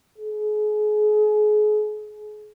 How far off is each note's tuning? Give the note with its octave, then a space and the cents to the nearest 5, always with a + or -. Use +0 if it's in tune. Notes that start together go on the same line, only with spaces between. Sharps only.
G#4 +35